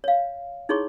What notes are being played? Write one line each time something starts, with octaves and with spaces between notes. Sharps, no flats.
C#5 F5
D#4 E4 G#4 C#5 C6 C#6